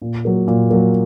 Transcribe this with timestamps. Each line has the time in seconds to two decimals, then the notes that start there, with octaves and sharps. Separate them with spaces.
0.02 A#2
0.25 F#3 A#3
0.47 A#2
0.70 F#3 A#3